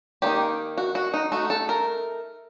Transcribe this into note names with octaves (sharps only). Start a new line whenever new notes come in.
D#3 G3 A#3 D#4 G4
F#4
F#4
D#4
A3 D#4 F#4
A4
A#4